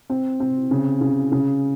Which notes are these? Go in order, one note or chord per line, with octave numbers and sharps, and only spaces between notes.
C4
C4
C#3
C#3
C#3